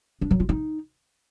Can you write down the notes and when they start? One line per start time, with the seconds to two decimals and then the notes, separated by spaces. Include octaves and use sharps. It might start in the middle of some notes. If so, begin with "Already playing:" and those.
0.21 D4
0.31 F#3
0.40 F4
0.49 D#4